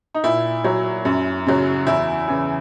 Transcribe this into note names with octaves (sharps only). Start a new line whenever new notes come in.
D#4
A#2 E4
F#3
F#2
C#3 F#3
E2 E4
C#3 E3